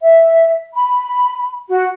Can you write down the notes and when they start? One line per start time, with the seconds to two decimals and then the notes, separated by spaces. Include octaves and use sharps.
0.01 E5
0.74 B5
1.69 F#4